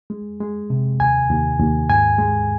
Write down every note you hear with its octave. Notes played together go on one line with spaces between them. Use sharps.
G#3
G#3
C3
D#2 G#5
D#2
D#2
G#2 G#5
G#3